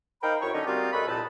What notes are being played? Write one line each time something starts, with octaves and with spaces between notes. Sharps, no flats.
D#4 A#4 C5 F5 G5 B5
F#2 C4 E4 C#5 C#6
D3 C#4 D#4
G3 A#3 C4 D#4 F4 F#4
F#2 G#3 A4 B4 B5 C#6
C2 F2 A#2 D#4 A5 B5